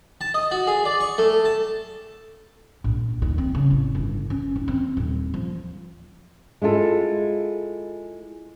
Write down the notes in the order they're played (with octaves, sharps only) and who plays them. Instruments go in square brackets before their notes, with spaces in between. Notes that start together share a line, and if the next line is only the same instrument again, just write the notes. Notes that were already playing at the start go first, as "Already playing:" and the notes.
[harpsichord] A5
D#5
F#4
G#4
D5
C#6
A3
A5
[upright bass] A#1
D#2
C4
C#3
A1
G1
C#4
D#2
C4
D#1
F3
[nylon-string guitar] G#3 E4 F4 A4